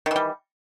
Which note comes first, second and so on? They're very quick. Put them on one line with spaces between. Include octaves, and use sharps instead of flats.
D#3 E3 G3